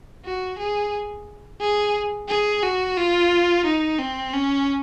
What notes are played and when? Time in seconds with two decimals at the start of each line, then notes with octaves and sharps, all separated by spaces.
0.25 F#4
0.59 G#4
1.61 G#4
2.29 G#4
2.63 F#4
2.97 F4
3.65 D#4
3.99 C4
4.33 C#4